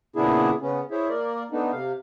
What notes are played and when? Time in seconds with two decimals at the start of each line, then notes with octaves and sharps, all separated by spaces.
0.16 A#2 C#3 B3 D4 E4 G#4
0.61 C#3 B3 C#4
0.91 E4 G#4 C5 C#5 E5
1.09 A#3 A#4 D5
1.51 A3 B3 D4 D#4
1.72 C3 F5